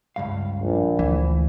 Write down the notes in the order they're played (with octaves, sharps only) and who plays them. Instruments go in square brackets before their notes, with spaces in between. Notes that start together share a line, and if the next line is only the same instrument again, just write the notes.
[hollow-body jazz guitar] C#2 G2 F5
[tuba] A#1
[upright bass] D2 [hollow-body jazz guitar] E3